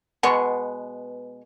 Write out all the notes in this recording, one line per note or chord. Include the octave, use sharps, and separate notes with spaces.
B2 G#3 B3 C#6